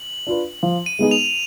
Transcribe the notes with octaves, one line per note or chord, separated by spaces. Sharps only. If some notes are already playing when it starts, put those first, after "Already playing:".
Already playing: F#7
D4 F4 B4
F3
D#7
G#3 B3 D#4 G#4
F7